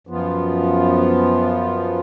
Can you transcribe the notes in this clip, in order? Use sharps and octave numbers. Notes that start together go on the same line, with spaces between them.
F#2 F3 B3 F4